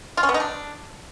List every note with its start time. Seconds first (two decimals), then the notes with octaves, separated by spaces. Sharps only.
0.17 F4
0.23 C#4
0.29 B3
0.34 D#4
0.40 D4